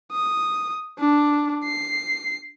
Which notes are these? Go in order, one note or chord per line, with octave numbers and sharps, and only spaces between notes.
D#6
D4
C7